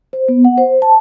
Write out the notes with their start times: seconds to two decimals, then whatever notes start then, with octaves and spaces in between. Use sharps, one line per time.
0.13 C5
0.28 B3
0.45 F#5
0.58 C5
0.82 A5